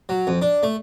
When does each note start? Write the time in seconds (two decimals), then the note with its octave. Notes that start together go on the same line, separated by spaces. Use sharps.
0.09 F#3
0.27 F2
0.42 D4
0.63 A3